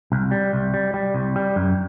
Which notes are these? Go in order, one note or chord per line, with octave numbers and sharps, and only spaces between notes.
C2
G3
C2
G3
G3
C2
G3
F#2